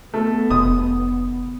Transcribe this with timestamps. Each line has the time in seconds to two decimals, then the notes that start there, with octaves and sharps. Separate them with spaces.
0.14 A3 B3
0.50 F1 D#6